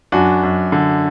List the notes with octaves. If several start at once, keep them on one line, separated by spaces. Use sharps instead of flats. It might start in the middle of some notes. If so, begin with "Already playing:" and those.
F#2 D4 F#4
F#2
D3